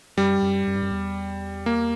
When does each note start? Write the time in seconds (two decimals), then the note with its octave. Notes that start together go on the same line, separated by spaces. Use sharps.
0.17 F#2 G3
0.42 F#2
0.67 F#2
0.75 G2
0.82 F#2
0.92 E2
1.66 A#3